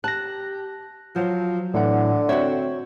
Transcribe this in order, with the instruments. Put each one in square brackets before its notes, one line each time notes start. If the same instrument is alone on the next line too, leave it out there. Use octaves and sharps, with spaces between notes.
[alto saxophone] G4 [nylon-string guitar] A5 [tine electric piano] F#6 A#6
[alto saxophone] F3 [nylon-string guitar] F#3
[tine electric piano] A2 F#5 [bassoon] D3 [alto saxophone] E3
[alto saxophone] C4 [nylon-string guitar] F#4 E5 [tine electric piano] C#5